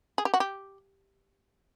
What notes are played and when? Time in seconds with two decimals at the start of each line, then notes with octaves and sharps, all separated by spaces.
0.18 G#4
0.25 G4
0.34 F#4
0.40 G4